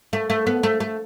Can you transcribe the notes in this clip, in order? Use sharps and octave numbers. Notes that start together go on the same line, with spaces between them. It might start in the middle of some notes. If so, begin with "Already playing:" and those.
A3
A3
B3
A3
A3